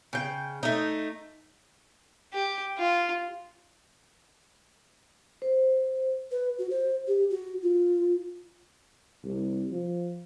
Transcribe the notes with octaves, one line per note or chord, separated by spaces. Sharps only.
C#3 G5
A3 D#4
G4
F4
C5
B4
F#4
C5
G4
F#4
F4
C2
F3